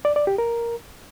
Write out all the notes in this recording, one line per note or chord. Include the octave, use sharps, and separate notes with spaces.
D5
D5
G4
A#4